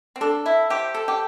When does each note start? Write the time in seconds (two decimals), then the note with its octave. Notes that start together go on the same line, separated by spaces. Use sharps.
0.16 C4
0.21 D4 A4
0.46 E4 E5
0.70 G4 C5
0.94 A4
1.08 G4